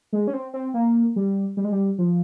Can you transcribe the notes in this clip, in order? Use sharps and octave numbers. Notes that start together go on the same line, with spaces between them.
G#3
C#4
C4
C4
A#3
G3
G3
G#3
G3
F3